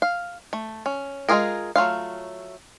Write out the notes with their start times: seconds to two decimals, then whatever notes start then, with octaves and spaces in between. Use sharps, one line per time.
0.02 F5
0.53 A3
0.86 C#4
1.29 G#3 A3 F4 G#4 A#4
1.76 F#3 A3 F4 F5